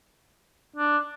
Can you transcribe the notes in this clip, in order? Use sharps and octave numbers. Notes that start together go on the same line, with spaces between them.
D4